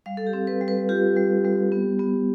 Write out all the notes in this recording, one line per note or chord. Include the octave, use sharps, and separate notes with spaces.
G3 F5
A4
G4
C4
B4
G3
B4
F4 G4
G3
G3
B3
B3